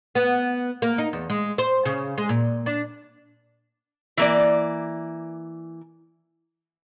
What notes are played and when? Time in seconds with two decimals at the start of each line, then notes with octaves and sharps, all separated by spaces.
0.15 B3
0.82 A#3
0.98 D#4
1.13 E2
1.30 G#3
1.58 C5
1.85 C#3
2.18 G#3
2.29 A#2
2.66 D4
4.17 E3 A#3 D5